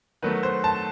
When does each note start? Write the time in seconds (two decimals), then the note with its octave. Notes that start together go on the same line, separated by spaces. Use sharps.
0.22 D#3 F#3 A3 B4
0.43 C5
0.64 A5